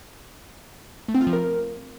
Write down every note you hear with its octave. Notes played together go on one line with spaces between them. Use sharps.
A3
C4
F4
F3
A#4